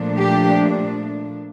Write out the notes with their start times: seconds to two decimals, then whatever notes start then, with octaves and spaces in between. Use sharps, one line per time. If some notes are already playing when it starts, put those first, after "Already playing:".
Already playing: A#2 F3 A3 D4
0.17 G4